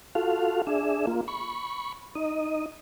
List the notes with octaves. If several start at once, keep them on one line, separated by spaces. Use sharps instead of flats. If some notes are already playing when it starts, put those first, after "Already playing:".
F4 F#4 A4 F5
D4 G#4 E5
A#3 F4
B5 C#6
D#4 D#5